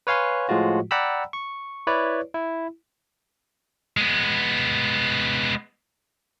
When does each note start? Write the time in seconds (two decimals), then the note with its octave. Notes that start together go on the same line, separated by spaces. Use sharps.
0.07 B4 C#5 F5 G#5 C6
0.49 A2 F3 G#3 F4 F#4
0.91 D5 F#5 G5 A#5 B5 E6
1.33 C#6
1.87 E4 B4 C#5 D5
2.34 E4
3.97 G#3 B3